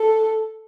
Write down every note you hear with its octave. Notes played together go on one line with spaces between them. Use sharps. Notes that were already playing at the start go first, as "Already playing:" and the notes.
Already playing: A4